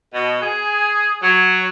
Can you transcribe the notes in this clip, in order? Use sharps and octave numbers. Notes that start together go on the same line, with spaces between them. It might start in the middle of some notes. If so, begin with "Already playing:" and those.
B2
G#4
F#3